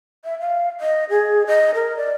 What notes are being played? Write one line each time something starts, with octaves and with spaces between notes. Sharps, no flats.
E5
F5
D#5
G#4
D#5
A#4
D5